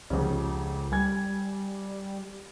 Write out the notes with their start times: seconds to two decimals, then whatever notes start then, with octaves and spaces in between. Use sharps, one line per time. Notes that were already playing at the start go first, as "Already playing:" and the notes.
0.10 F1 C#2 C#3
0.92 G3 G#5 G#6